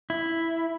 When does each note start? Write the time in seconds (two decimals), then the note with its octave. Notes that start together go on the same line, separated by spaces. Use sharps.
0.10 E4